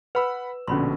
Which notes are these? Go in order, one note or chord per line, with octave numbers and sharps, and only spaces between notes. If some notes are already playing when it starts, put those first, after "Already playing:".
B4 F#5 B5 E6
A#1 B2 D3 C#4 B5 C6